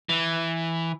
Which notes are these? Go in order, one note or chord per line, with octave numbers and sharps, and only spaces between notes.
E3